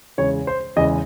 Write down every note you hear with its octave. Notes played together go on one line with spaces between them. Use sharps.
E2 C#3 G#3 C#5
C5
E2 C#3 G#3 D#5